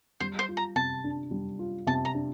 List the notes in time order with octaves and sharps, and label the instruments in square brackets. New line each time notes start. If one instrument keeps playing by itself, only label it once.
[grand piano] G3 [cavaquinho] C5
[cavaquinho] C5
[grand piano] F4
[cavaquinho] A#5
[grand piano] C3 [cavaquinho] A5
[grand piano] D4
G3
F4
[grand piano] C3 [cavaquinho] A5
[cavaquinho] A#5
[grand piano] D4